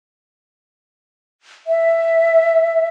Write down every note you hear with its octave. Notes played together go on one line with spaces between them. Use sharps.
E5